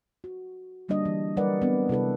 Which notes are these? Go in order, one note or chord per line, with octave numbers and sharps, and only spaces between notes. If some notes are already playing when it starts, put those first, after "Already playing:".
F#4
D3 G3 A#3 D4 D#5
E3
F#3 G3 A#4 B4 D5 F#5
B3 C4 D4
C3 E4 A4 B4